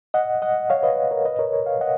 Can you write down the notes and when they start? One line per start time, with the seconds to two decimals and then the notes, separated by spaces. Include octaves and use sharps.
0.14 D#5 F#5
0.42 D#5 F#5
0.70 C#5 F5
0.83 B4 D#5
1.11 A#4 C#5
1.25 B4 D#5
1.39 A#4 C#5
1.52 A#4 C#5
1.66 C#5 F5
1.81 D#5 F#5